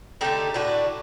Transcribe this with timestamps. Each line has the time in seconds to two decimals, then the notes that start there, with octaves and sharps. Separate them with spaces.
0.21 D3 A3 D#4 G4
0.54 A2 A3 D4 F#4